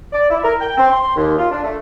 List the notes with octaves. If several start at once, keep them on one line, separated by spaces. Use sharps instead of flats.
D5
E4
A#4
G5
C4
C6
D#2
F4
D4
A3